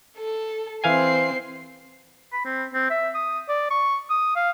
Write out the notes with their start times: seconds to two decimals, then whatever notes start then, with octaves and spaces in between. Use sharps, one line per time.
0.17 A4
0.84 E3 C4 F5 G#5 C7
2.32 B5
2.45 C4
2.74 C4
2.90 E5
3.14 D#6
3.49 D5
3.70 C#6
4.10 D#6
4.36 F5